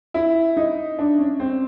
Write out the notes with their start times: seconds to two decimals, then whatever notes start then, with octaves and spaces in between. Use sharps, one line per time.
0.14 E4
0.57 D#4
0.99 D4
1.19 C#4
1.40 C4